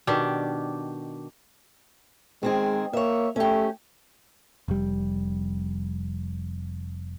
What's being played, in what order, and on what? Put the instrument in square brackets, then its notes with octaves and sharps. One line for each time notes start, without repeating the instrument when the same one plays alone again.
[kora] B2 D#3 D4 G4
[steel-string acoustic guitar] D#3 C4 G#4 [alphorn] G#3
[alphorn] A#3 [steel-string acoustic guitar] C#5 E5
[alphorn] A3 [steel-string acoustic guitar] C#4 G4
[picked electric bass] F1 G3